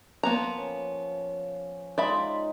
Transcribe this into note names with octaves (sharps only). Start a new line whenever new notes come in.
F3 A#3 B3 A#5
C#4
G#3 D#4 F4 D5 E5 B5